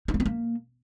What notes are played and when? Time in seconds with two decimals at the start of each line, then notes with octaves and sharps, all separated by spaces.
0.08 D#4
0.14 A#3
0.20 B3
0.26 A#3